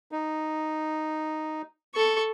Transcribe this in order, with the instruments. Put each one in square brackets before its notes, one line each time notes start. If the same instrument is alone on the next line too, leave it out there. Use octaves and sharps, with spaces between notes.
[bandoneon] D#4
[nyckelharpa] A4 C#6